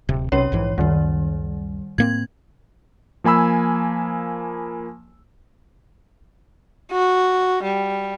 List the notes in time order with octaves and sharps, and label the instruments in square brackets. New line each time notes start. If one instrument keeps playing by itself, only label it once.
[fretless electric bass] D1 C3
[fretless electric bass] B1 C3 [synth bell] C#4 C#5
[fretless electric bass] A#1 G#2 E3
[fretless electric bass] C#2 F#2 [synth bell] D#3 G3
[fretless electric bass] A2 A#3 C4 [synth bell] G#6
[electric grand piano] F3 A#3 G#5 B5 E6
[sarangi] F#4
G3